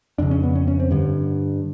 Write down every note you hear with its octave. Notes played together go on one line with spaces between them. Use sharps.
F2 C#3 D4
C#4
B3
C#4
C#4
C4
G2 D3